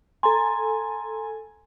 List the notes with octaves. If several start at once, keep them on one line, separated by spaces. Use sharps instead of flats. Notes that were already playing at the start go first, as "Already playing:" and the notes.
A4 G#5 A#5 C6